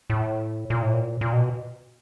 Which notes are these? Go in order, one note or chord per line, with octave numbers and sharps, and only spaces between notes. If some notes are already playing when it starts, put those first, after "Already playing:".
A2
A#2
A2
A#2
A#2
B2